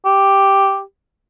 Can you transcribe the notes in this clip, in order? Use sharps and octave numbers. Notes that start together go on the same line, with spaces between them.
G4